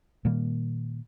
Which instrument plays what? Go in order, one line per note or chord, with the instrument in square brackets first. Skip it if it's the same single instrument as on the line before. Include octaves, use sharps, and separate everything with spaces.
[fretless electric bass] A#2 D#3 G3 A#3